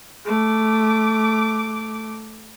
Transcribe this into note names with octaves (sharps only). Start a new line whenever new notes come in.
A3 D6